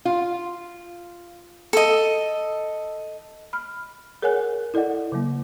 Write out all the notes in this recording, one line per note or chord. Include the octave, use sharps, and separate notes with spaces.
F4
A4 D#5
B5 F6
G#4 A#4 C#5 F#5 G#5 F#6
E4 A4 D5 D#5 F#5
C#3 F#3 A#3